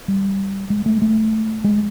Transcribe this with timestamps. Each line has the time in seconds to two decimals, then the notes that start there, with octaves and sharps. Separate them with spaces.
0.08 G3
0.70 G#3
0.86 A3
1.02 A3
1.64 G#3